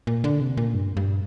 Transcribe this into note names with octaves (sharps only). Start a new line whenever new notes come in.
A#2
D3
C3
A#2
G2
G2